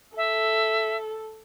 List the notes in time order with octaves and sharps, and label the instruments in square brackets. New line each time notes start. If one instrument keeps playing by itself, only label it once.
[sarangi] A4 [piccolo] E5